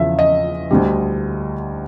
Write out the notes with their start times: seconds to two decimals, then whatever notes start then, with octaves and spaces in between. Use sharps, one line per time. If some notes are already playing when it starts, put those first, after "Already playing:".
Already playing: E2 C#3 F3 E5
0.19 D#5
0.71 D2 D3 G3